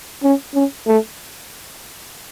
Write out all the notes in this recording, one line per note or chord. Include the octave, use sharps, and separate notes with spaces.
C#4
C#4
A3